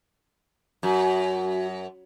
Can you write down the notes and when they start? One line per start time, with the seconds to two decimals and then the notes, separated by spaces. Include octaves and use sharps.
0.83 F#2 F#4